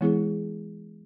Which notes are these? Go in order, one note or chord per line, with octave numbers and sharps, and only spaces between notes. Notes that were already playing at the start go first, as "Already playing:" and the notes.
E3 G#3 B3 E4 G#4